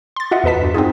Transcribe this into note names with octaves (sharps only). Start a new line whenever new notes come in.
C6 A6
F4 F#4 D#5 E5 F#5
E2 A4 B4 D#5 A5 B6
G2 F#4
C4 D#4 F4 G#4